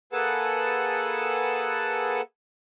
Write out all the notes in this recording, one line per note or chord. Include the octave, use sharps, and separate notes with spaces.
A#3 G#4 A4 B4 F#5 A5